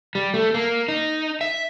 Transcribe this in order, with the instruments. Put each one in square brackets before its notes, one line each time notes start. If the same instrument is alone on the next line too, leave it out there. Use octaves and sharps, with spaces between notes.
[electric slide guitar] G3
A3
A#3
D#4
E5